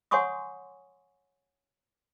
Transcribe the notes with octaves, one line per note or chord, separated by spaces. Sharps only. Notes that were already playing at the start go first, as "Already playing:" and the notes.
C#5 F#5 G#5 C6 C#6 D#6